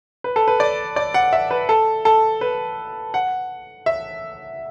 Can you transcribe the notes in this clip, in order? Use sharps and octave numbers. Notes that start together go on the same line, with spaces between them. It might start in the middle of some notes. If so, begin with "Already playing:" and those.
B4
A4
B4
D5
D5
F#5
E5
B4
A4
A4
B4
F#5
E5